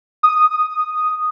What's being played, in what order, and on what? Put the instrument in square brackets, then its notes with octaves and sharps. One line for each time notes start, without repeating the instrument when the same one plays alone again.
[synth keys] D#6